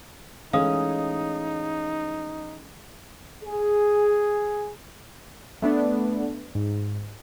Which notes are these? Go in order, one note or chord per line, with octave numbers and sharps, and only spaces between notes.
E3 G#3 A3 C#4 D#4 F5 D#6
G#4
A3 B3 D4
G#2